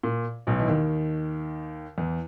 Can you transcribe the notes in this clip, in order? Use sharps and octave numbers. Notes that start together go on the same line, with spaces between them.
A#2
B1 B2
E3
D#2 D#3
E2 E3